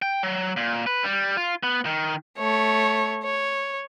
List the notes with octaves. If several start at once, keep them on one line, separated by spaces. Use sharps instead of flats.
G5
F#3
A#2
B4
G3
F4
B3
D#3
A3 C#5
C#5